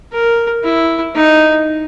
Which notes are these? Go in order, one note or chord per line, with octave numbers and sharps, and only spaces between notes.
A#4
E4
D#4